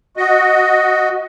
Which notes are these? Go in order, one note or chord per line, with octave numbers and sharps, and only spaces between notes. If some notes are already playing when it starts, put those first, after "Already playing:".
F#4 D#5